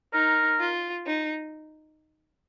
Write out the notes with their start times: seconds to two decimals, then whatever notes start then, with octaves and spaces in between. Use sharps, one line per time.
0.13 D#4 A#4
0.60 F4
1.06 D#4